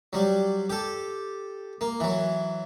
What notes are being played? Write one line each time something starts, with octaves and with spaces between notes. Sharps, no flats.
F#3 G3
G4 A4
A#3
E3 F#3